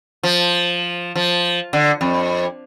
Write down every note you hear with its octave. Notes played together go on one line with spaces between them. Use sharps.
F3
F3
D3
F2